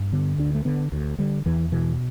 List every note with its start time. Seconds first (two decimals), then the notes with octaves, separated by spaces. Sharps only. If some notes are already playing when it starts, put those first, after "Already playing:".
Already playing: G2
0.12 D3 B3
0.38 D2 D4
0.54 A3
0.65 D3 B3
0.92 D2
1.18 D3 G3
1.46 E2 E3
1.72 B2 E3